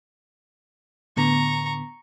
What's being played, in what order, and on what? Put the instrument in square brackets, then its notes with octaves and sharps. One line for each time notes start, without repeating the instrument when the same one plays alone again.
[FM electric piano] A2 D3 B3 [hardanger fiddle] A#5 C#6